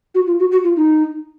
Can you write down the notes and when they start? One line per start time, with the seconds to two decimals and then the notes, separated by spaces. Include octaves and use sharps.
0.15 F#4
0.27 F4
0.39 F#4
0.52 F#4
0.64 F4
0.76 D#4